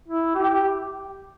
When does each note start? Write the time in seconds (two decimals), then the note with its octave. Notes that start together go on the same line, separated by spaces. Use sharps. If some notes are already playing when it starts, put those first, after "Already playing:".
0.08 E4
0.35 G4